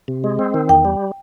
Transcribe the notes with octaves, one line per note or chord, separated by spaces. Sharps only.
C3
G#3
C4
D#3
E2 G5
G3